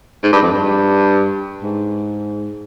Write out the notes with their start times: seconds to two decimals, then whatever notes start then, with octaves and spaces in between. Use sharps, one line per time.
0.23 G#2
0.33 G2
0.42 F2
0.52 G2
1.63 G#2